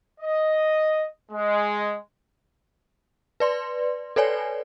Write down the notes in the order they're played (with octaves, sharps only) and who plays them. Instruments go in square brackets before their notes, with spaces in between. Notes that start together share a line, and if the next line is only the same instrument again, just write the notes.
[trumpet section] D#5
G#3
[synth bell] B4 D5 C6
A4 B4 C#5 D5 G#5